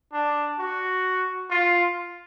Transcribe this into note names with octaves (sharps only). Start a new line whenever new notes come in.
D4
F#4
F4